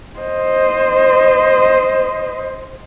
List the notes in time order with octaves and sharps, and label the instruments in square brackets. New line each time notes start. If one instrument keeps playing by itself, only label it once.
[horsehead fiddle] C5 D#5